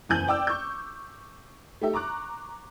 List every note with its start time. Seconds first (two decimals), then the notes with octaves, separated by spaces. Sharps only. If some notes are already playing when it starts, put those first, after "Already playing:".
0.09 F#1 E2 G#5 A5 G6 F#7
0.28 D5 G5 D6 E6
0.47 C#6 G6
1.81 A3 D#4 G4 E5
1.93 A#5 C#6 D6 F#6